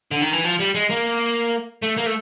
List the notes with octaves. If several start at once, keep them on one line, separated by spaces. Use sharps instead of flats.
D3
D#3
E3
F3
G3
G#3
A#3
A3
A#3
A3